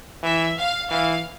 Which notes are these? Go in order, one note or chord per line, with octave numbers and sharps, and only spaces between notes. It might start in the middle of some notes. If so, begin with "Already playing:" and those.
E3 E5
F5
E3 F5